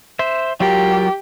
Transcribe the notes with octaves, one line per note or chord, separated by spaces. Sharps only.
C5 E5
F#3 F4 G4 A#4